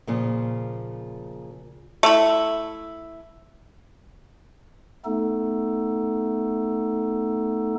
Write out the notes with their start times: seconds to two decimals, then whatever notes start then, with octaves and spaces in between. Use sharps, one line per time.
0.07 A#2 C#3 F3
2.03 A3 E4
5.05 A3 B3 D#4 A4